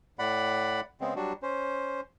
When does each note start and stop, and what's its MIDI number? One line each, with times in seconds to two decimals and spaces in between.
0.19 0.80 45
0.19 0.80 74
0.19 0.80 78
0.19 0.80 83
1.01 1.14 49
1.01 1.14 56
1.01 1.14 59
1.01 1.14 60
1.16 1.33 54
1.16 1.33 55
1.16 1.33 62
1.16 1.33 66
1.42 2.01 61
1.42 2.01 72